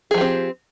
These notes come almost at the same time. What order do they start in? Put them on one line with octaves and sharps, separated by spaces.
G#4 F3 G4 C4